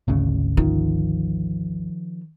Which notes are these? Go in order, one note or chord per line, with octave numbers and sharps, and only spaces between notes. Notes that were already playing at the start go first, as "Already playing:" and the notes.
G#1 D2 C#3
D#3 F3